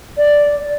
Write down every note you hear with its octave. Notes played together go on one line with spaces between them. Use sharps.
D5